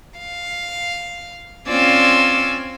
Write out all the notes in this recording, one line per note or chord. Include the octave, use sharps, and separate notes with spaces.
F5
C4 C#4 F4 D5 G#5 E6